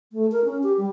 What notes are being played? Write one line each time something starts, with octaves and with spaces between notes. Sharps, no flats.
A3
A#4
C#4
G4
G3